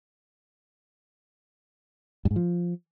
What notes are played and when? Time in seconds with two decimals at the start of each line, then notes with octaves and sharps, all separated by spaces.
2.25 G2
2.31 G#2
2.36 F3